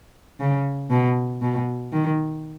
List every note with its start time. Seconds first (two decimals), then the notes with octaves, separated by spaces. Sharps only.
0.40 C#3
0.91 B2
1.42 B2
1.92 D#3